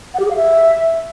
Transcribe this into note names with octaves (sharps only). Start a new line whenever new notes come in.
F#5
G4
G#4
F5
E5